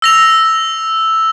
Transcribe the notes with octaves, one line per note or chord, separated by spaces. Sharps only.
E6 A#6 F7